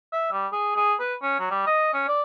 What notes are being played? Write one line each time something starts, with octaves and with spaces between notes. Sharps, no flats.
E5
G3
G#4
G#4
B4
C#4
F#3
G3
D#5
C#4
D5